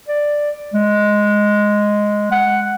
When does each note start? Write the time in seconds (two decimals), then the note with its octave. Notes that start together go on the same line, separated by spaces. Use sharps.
0.08 D5
0.74 G#3
2.31 F#5